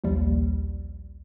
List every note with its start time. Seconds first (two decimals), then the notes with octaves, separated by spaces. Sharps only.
0.04 A#1 D#2 G3